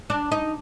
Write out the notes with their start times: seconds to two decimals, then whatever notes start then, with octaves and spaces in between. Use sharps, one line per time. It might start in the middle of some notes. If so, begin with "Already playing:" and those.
0.10 D4
0.32 D#4